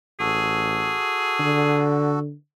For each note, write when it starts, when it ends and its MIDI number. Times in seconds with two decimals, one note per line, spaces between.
0.20 0.97 33
0.20 2.19 66
0.20 1.84 68
0.20 2.19 69
1.40 2.33 50